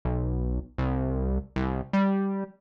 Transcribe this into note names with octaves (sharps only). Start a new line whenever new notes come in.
B1
C2
C2
G3